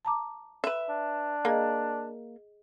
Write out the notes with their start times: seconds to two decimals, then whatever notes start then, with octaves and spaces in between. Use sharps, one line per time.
0.05 A5 A#5 D6
0.64 B4 E5
0.89 D4
1.45 A#3 G#4 D#5